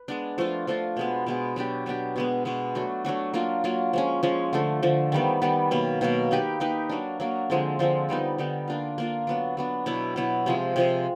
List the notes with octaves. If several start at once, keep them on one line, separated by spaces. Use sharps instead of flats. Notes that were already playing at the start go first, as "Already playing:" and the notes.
Already playing: B4
G#3 B3 D4
F3 A3 D4 F4
F3 A3 D4 F4
B2 G#3 B3
B2 G#3 B3
F#3 B3 D4 G4
F#3 B3 D4 G4
B2 G#3 B3
B2 G#3 B3
F#3 A3 D4 F#4
F#3 A3 D4 F#4
F#3 A#3 D4 F4
F#3 A#3 D4 F4
F3 G#3 C#4
F3 G#3 C#4
D3 F3 A3
D3 F3 A3
D#3 G3 B3
D#3 G3 B3
B2 F#3 A#3
B2 F#3 A#3
A#3 D#4 G4 B4
A#3 D#4 G4 B4
F#3 A#3 D4
F#3 A#3 D4
D3 F3 G#3 C4
D3 F3 G#3 C4
D3 G3 B3 D#4
D3 G3 B3 D#4
A#3 D4 F4
A#3 D4 F4
F#3 B3 D4
F#3 B3 D4
B2 F#3 B3 E4
B2 F#3 B3 E4
C3 F3 G#3
C3 F3 G#3